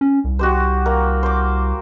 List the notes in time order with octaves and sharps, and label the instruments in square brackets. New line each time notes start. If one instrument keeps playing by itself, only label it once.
[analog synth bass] C#4
C2
[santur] F#4 G4 C5
A#3
C5 D6